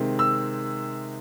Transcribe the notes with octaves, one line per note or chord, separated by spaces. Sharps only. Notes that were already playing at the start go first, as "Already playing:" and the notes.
Already playing: C3 D#3 G#3 C4
E6